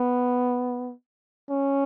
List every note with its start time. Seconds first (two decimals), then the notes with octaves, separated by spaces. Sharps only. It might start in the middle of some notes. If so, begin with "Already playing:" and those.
Already playing: B3
1.49 C#4